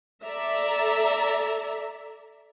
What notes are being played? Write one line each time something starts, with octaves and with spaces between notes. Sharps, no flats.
A4 D5 E5 A#5